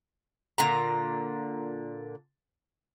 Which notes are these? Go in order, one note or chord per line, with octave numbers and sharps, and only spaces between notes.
A#2 D3 A#5